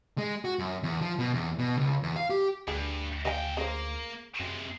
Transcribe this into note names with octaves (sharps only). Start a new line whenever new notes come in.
G#3
F#4
F#2
E2
F3
B2
E2
B2
C#2
E2
F5
G4
D2 G2 G#4
C#3 D#5 F5 G5 G#5
C#3 A#3 C5
F#2 C3 G#3